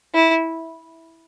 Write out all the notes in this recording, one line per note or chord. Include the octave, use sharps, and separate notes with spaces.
E4